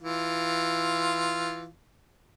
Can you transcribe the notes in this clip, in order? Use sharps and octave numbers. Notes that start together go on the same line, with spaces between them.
E3 F4